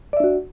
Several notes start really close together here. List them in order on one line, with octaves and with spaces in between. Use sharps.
D5 E5 D4 F#4